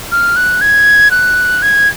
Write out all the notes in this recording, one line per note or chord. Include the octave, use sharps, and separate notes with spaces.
F6
F#6
G#6
F#6
G#6